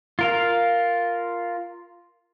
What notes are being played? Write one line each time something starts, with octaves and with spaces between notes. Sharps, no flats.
F4 A#4 F5